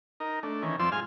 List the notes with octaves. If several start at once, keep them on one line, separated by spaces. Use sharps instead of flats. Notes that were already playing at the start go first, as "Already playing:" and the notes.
D#4 A#4
A3 D4
D#3 E3 C#4
F2 F3 C4 D5 C6 E6
G#2 F4 G#5 F6